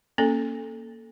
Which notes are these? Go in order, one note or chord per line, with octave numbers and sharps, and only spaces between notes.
A#3 C#4 A4